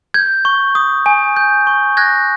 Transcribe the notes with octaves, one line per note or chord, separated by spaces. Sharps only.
G6 G#6
C#6
D#6
G#5
G6
C#6
F#6 G#6 A#6